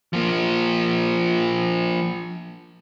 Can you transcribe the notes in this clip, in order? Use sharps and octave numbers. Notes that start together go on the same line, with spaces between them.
F3 A#3